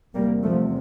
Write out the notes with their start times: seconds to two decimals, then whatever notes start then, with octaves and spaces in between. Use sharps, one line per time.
0.15 E2 C3 G3 A#3
0.43 F3 A3